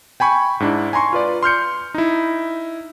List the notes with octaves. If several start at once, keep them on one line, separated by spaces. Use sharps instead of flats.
G5 G#5 B5 C#6
G#2 D4 E4
G#5 A#5 C6 C#6
F4 B4 D5
C6 F6 G6 C#7
D#4 E4